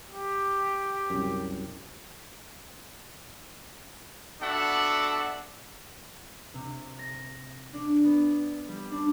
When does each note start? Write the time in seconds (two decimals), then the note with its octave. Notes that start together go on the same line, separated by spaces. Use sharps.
0.12 G4
1.10 C2 F#2
4.40 B3 D4 F#4 A4 E5 F#5
6.54 C3
6.99 A#6
7.73 D4
8.05 B3
8.68 G3
8.91 D4